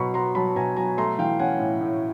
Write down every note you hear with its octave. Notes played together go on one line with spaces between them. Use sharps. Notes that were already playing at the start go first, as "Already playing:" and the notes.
Already playing: B2 F#3 A#5 B5 C#6
B3 A#5 C6
F#3 A5 B5
B2 G#5 A#5
F#3 G#5 A#5
A3 A#5 C6
E3 F5 G5
C#4 F#5 G#5
A2
A2